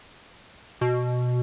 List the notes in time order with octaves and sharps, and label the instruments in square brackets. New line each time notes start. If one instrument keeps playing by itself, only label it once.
[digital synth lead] B2